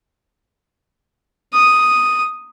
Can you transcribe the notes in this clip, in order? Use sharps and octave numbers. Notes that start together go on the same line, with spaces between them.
D#6